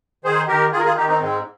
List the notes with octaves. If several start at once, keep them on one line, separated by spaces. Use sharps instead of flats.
D#3 G#4 C5
D#3 G4 A#4
D#3 F4 G#4
A#4
F4 G#4
D#3 D#4 G4
C4 D#4
G#2 G#3 C4